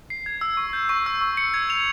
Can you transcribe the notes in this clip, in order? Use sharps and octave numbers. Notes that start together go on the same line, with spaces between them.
C7
G#6
E6
C#6
G6
C#6
E6
C#6
C#7
G#6
F7